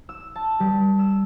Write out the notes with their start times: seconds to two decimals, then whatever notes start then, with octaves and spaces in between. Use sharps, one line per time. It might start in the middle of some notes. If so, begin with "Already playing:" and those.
0.09 E6
0.35 A5
0.60 G3
0.99 E6